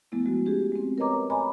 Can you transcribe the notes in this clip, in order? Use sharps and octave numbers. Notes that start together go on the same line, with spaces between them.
F3 G#3 A3 B3 E4
F3 G#3 F#4
C#4 G4 G#4
G#3 C4
A#4 B4 C#5 D#5 A#5 D6
C#5 D#5 G#5 A#5 B5 D6